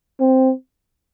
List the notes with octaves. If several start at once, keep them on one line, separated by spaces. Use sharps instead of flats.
C4